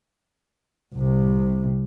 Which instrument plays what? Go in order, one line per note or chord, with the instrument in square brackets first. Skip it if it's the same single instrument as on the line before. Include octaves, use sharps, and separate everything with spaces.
[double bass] C2 C3